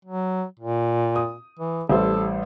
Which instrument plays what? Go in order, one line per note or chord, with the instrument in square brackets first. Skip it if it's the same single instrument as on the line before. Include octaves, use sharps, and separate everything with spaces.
[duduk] F#3
A#2
[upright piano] D#6
[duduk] E3
[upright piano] A1 G3 C5 [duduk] A4